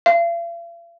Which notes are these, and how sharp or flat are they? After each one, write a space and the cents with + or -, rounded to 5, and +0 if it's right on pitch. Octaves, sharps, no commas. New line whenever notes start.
F5 -45